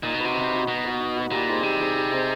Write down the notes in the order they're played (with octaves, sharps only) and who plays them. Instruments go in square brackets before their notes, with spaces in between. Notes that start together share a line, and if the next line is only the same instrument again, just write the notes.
[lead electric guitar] A#2 [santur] D#4
[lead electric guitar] B2
[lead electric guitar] C3 [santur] F#4 B4
[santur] D#4
F#4 B4
[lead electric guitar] B2 [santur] D#4
[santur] F#4 B4
D#4
F#4 B4
[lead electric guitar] A#2 [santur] G3
[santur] C4 D#4 G#4
[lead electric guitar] C3 [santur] G3
[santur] C4 D#4 G#4
G3
C4 D#4 G#4